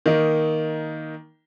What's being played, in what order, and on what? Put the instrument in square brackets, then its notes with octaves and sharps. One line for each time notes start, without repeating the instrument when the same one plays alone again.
[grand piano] D#3 A#3 D#4